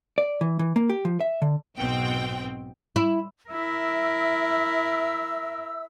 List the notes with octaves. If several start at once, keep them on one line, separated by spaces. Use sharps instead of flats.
D5
E3
E3
A#3
G4
F3
E5
D3
B1 G#2 B2 C4 G5
E4
E4 A#4 E5 E6